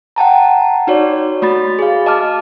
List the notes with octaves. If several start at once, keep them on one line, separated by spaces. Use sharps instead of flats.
F#5 G5 A5 A#5
D#4 F#4 C#5 D5
A3 F#4 B5 A6
G#4 F5
D#5 A5 D6 F6